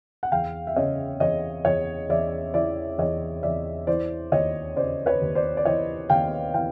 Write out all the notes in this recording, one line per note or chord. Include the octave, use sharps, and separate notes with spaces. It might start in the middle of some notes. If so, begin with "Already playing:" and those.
F#5
E2 F5 G5
E5
C#3 C#5 D#5
E2 C#5 D#5
E2 C#5 D#5
E2 D5 E5
E3 D5 E5
E2 C#5 D#5
E2 D5 E5
E3 C5 D5
D#2 C#5 D#5
C#3 C5 D5
B4 C#5
D#2
C5 D5
D5
E3 C#5 D#5
D#2 F5 G5
E3 F5 G5